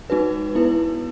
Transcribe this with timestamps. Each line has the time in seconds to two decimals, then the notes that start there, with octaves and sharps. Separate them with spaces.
0.10 G#3 D#4 F#4 B4
0.55 B3 E4 B4